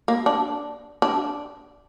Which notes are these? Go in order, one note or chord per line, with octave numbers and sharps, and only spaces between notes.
A#3
D4
D4